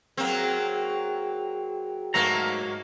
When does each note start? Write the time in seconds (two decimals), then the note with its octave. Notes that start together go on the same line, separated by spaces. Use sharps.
0.17 F#3 A#3 C4 G#4 G5
2.14 G#2 F#3 A3 A#3 A#5